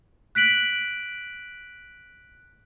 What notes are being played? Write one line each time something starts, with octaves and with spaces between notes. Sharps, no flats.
F#6 B6 D7 F#7